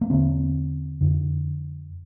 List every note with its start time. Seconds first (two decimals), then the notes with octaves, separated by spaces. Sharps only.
0.01 A#3
0.10 E2 D3 C4
1.01 F2 D3